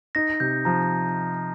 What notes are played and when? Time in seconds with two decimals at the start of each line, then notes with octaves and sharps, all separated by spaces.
0.15 D#4 A#6
0.40 C3 G6
0.65 F3 A#5